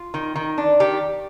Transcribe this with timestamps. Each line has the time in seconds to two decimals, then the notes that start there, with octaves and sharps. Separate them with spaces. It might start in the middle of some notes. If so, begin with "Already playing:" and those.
Already playing: F4
0.14 D#3
0.36 D#3
0.58 D4
0.80 D#3 G4